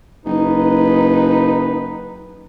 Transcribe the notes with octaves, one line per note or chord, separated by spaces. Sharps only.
F#1 D#4 B4